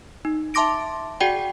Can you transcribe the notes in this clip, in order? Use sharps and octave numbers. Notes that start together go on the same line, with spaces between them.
D#4
E5 A5 C6 D6 A#6 D7
F#4 G#4 D5 F#5 G5